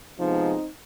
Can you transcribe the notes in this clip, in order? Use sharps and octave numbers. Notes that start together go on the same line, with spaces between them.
C3 F3 G#3 B3 C4 D#4